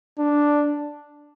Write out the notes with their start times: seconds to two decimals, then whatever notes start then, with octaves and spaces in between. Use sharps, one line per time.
0.19 D4